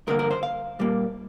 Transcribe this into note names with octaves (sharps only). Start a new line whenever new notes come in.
G2 D3 A#3 A#4
A#4
C5
F5
A#2 G3 A#3